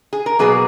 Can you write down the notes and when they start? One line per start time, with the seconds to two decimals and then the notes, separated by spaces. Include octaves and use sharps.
0.13 G#4
0.26 A#4
0.39 B2 F#3 A#3 G#4 B4